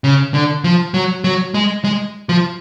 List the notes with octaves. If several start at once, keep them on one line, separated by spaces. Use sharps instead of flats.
C#3
D3
F3
F#3
F#3
G#3
G#3
F3